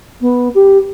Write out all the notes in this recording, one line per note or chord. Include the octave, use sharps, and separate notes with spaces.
B3
G4